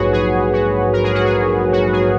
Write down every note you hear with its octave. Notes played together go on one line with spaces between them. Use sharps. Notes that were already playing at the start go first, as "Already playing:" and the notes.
Already playing: A#1 G#2 F#3 F#4 G#4 B4 C#5
G#4
F#4
A#4
G#4
F#4
G#4
F#4
G#4